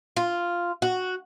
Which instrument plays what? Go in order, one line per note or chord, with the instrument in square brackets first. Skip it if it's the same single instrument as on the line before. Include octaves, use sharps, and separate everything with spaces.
[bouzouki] F4
F#4